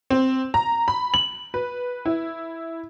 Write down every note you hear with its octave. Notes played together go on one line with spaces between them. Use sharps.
C4
A#5
B5
F#7
B4
E4